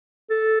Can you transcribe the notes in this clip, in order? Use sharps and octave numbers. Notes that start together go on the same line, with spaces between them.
A4